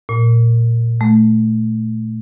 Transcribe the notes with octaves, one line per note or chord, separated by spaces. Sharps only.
A#2
A3